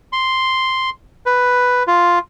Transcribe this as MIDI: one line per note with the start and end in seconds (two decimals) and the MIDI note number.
0.13 0.90 84
1.26 1.83 71
1.87 2.19 65